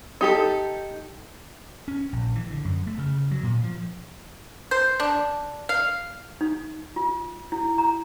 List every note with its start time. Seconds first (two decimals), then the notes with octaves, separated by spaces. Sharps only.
0.21 D#4 G4 A4
1.88 C#4
2.13 A#1
2.35 E3
2.51 D3
2.65 F#2
2.87 A3
2.98 C#3
3.31 F#3
3.43 A#2
3.63 F3
4.71 C5
5.00 D4
5.69 F5
6.41 D#4
6.96 F4
7.52 E4
7.78 A#5